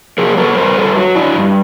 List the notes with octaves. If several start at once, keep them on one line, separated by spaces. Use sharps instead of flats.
F#3 G#4 A#4
A4 B4
G2 A#4 C5
A4 B4
F#3
D4 E4
G2